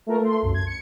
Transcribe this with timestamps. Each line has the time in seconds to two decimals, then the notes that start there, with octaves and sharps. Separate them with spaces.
0.07 A3 B3 F4 A#4
0.20 A3 C6
0.42 C2 F#2
0.54 G#6
0.67 C#7